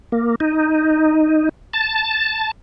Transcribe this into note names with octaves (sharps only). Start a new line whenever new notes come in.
A#3
D#4
A5